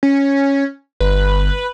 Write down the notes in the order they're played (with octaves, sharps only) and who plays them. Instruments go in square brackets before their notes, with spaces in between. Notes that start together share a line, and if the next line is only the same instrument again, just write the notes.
[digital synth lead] C#4
[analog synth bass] G1 [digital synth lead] B4